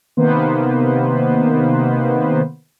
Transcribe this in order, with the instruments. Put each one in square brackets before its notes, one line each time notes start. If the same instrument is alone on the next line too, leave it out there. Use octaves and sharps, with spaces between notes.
[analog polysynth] C3 D#3 A#3 B3 B4 C5